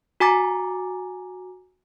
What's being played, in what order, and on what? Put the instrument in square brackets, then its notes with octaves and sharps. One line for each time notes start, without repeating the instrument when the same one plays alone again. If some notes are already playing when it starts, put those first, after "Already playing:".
[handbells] F#4 G#5 A#5 D6 A6